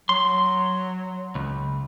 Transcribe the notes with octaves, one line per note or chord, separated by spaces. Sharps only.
F#3 C6
C#2